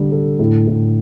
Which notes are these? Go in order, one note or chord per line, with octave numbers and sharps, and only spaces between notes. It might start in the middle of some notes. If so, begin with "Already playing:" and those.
Already playing: D3 G3 D4
A4
A2
A2